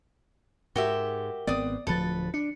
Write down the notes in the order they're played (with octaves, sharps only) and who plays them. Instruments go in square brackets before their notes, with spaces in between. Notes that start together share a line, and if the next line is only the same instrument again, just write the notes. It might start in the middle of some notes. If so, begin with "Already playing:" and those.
[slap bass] G#2 [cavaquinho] F#4 G4 E5 [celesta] A#4 G5 G7
[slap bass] G#1 B3 C4 [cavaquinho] D5 D#6
[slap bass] D1 D2 F3 [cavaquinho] A4 B4 [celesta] A6
[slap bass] D4 [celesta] C#7